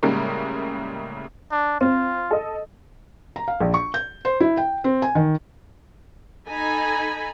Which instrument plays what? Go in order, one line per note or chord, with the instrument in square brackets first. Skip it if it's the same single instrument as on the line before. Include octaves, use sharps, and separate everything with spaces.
[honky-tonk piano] A2 C#3 G3 G#3 A#3
[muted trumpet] D4
[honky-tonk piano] C4 [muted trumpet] F4
[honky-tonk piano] A4 D#5
[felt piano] A#5
F5
A#1
C#6
G6
C5
E4
G5
C4
G#5
D#3
[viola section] D#4 A4 G#5 A#5 B5